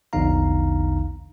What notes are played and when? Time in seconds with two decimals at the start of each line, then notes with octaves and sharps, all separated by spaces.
0.13 A#1 E2 D3 D#4 F5 A#5